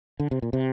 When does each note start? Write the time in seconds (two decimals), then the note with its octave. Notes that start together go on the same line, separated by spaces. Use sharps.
0.20 D3
0.31 C3
0.42 A#2
0.53 C3